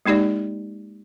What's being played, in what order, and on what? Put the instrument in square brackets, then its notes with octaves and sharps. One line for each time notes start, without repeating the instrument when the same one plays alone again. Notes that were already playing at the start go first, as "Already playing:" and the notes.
[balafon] G#3 A#3 D#4 G4 D5